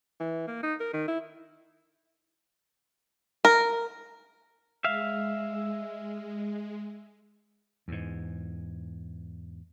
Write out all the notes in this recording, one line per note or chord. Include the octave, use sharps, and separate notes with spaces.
E3
A#3
D#4
A#4
D#3
E4
A#4
G#3 E5 F5
E2 G#2